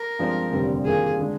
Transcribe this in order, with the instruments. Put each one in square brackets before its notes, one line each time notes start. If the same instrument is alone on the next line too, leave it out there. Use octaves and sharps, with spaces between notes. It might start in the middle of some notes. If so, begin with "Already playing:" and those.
Already playing: [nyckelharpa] A#4
[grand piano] G2 F3 G#3 C4
F1 D#2 D3 G3 C4
[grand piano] G2 D#3 A#3 F4 [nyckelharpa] G#4
[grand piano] D3 G#3 D4